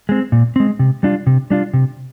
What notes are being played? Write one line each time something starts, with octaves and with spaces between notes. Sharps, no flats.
G#3 C4
A#2
G#3 C4
C3
G3 D4 F4
C3
G3 D4 F4
C3